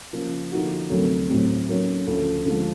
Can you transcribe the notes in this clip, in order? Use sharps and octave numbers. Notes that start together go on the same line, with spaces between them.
C#3 F3 A#3
D3 F3 A#3 D#4 F#4
D2 C3 D#3 F#3
A2 F#3 A3 C4
D#3 F#3 A#3 C#4
D2 C#3 F3 A3
D3 F3 G#3